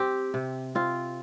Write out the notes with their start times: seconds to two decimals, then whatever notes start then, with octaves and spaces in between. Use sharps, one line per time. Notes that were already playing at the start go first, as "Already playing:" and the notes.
Already playing: C4 G4
0.34 C3
0.75 C4 F4